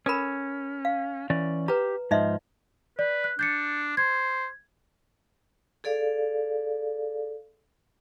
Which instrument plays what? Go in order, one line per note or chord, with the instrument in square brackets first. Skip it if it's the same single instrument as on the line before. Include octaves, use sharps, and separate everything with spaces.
[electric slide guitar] C#4 [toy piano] A4 A#4 B5
[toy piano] F5
[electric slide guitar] E3 C#4 D5
[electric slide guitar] G4 [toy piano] B4 A#5
[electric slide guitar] G#2 F3 [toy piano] D#4 D#5 E5
[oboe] B4 [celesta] D5
[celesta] F#6
[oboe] D4 [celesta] G6 A6 C#7
[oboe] C5 [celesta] G#6
[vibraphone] G#4 A4 D5 F5